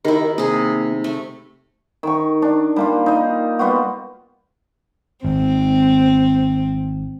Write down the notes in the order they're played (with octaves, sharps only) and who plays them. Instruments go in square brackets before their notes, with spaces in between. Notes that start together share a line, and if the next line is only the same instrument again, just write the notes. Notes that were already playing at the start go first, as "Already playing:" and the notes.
[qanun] D#3 E4 [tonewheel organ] G4 A#4 D#5
[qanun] C3 G#4 [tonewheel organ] A#3
[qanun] A3
[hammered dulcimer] D#3 C#6
D4
G3 A#3 F4
D#4 D#5
G3 B3 F4 F#4
[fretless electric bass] G#1 [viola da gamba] C4